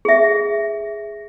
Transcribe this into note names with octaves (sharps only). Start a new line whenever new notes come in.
G#4 E5